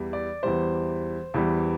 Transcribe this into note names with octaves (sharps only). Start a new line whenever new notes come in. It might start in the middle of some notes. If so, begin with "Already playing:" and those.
Already playing: E2 E3 G3
D5
E2 E3 G3 C5
E2 E3 G3